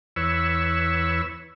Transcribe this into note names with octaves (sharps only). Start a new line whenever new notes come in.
E2 B4 C#5 E6